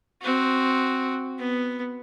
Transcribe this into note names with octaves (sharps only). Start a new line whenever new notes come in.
C4 F#4
B3